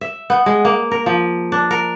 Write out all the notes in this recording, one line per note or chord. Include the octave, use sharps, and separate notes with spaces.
E5
B3
G#3
A#3
A#4
F3
D4
A#4